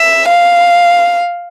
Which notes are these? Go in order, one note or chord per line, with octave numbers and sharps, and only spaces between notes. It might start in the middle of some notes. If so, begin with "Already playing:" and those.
Already playing: E5
F5